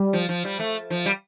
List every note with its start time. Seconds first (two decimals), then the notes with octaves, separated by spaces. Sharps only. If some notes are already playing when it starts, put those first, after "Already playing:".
Already playing: G3
0.13 F3
0.29 F3
0.45 G3
0.60 A3
0.90 F3
1.06 G3